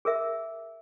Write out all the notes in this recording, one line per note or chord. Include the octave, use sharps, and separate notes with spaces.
G#4 A#4 E5